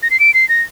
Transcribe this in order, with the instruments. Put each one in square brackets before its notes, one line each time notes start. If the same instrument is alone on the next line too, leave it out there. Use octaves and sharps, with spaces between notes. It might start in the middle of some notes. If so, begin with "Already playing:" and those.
[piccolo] A#6
C7
D7
C7
A#6